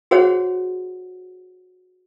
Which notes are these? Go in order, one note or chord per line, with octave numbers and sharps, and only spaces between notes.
F#4 G#4 C5 C#5 F#5